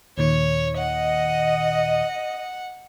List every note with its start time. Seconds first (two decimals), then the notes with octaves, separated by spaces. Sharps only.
0.18 D#2 A#2 D#3 C#5
0.78 D#5 F#5